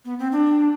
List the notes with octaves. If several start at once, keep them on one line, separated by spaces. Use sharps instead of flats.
B3
C4
D4